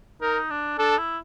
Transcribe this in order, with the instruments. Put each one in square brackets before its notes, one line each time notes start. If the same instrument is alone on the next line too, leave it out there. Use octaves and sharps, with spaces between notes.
[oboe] D#4 [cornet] A#4
[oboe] D4
[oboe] D4 [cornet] A4
[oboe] E4